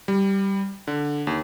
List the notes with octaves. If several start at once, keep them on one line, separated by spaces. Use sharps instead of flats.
G3
D3
D#2